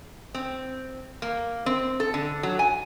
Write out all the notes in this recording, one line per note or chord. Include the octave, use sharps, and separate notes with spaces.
C4
A#3
C4
A4
D3
F#3
G#5